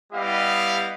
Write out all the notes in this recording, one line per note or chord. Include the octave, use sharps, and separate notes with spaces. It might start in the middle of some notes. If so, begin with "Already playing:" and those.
G3 B3 E4 G4 D#5 F5